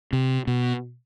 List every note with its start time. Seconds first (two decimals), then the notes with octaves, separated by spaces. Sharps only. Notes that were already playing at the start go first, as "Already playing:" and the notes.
0.13 C3
0.47 B2